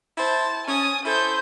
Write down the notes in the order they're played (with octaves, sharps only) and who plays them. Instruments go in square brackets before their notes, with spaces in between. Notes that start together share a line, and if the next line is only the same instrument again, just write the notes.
[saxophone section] E4 C5 [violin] A5
[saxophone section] C#4 [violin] G#5 D#6
[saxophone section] E4 A4 [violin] C5 G6